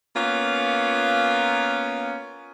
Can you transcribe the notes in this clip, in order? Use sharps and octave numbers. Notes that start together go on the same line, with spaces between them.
A#3 B3 C#4 F4